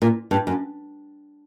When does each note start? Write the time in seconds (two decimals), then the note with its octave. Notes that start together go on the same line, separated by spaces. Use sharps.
0.02 A#2
0.31 G2
0.47 F#2